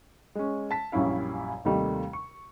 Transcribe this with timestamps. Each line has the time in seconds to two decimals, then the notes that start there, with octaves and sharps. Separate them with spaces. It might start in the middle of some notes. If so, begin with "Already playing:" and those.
0.35 G#3 C#4
0.71 A5 B6
0.92 A#1 F#2 G3 C#4 E4 F5
1.65 D#2 C3 D#3 G3 A3
2.13 C#6